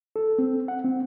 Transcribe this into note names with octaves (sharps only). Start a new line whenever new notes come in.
A4
C4
F#5
C4